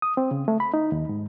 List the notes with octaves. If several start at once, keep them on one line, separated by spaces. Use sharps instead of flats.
D#6
C4
C#3
A3
B5
D#4
D#2
G#2